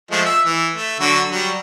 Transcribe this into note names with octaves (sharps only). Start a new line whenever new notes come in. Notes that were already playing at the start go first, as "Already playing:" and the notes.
F3 G#3 A3
E5
E3
A3
D3 F#3 F#4
F#3 G3